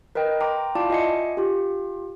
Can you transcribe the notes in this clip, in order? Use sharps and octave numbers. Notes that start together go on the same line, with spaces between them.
A#4 B4 D#5 G5
G5 A#5 C6 D6
E4 F4 D5 F5 A5 D6
F4 D#5 E5 G#5 C7 C#7
F4 G4